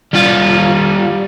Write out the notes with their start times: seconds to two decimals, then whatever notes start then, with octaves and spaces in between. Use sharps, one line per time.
0.14 G3 F4